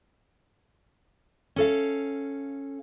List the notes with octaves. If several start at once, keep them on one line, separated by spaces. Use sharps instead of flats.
C#4 A4 F5